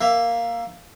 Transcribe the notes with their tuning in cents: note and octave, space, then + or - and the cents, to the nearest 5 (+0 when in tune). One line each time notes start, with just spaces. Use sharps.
A#3 +0 E5 +15